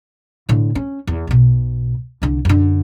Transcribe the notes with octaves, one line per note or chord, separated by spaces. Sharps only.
A2 D3
C#4
E2
B1 B2
C2 D3
F#2 D3